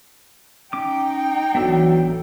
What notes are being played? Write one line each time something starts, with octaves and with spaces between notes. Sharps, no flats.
C#4 D#4 G5 D6
A1 D#2 E3 F#3 B3 D4 A4